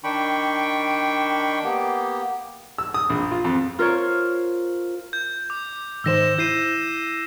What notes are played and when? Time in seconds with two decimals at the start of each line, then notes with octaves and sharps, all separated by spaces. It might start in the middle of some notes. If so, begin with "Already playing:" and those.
0.04 D#3 D4 G5 B5 C#6
1.64 A#3 B3 G4
2.78 E6
2.94 D#6
3.10 A#1
3.32 F4
3.44 F2
3.79 F4 A#4 C5 C#5
5.13 G6
5.50 D6
6.04 G#2 D#3 C5 E6 A#6 E7
6.38 E4 G6 C7 D#7